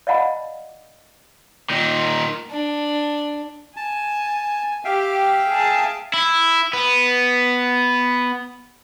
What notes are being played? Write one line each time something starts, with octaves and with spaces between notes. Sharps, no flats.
D5 D#5 F5 F#5 A5 B5
A#2 D#3
D4
G#5 A5
G4 E5 F5 G5
G#4 A5
E4
B3